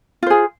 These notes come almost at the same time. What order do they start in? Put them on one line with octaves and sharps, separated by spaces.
F4 C5 G#4